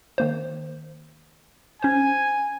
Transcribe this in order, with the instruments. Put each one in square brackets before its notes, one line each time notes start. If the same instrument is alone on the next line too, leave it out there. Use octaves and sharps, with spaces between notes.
[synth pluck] D#3 A#3 C5
[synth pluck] C#4 C5 [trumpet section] G#5